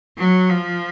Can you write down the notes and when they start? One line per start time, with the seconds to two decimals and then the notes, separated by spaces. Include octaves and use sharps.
0.18 F#3
0.50 F3